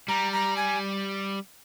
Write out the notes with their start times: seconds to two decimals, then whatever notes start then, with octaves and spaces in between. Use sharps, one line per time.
0.08 G3 A#5
0.33 A#5
0.57 G#5